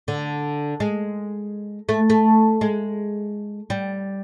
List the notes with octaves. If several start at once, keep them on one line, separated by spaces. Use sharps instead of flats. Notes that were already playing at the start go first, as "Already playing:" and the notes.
D3
G#3
A3
A3
G#3
G3